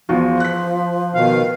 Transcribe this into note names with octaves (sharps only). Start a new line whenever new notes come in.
E2 F3 F4 F#4
F#6 B6
B2 D#3 F5